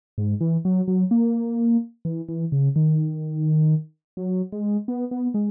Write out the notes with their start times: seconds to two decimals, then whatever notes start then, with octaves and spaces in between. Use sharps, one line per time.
0.18 G#2
0.41 E3
0.65 F#3
0.88 F#3
1.11 A#3
2.05 E3
2.29 E3
2.52 C#3
2.76 D#3
4.17 F#3
4.52 G#3
4.88 B3
5.11 B3
5.34 G#3